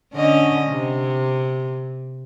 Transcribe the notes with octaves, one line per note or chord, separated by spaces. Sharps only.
D3 C#4 D#5
C3